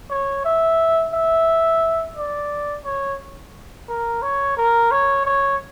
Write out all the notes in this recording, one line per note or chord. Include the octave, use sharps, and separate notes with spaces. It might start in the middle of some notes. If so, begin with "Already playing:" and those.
C#5
E5
E5
D5
C#5
A#4
C#5
A#4
C#5
C#5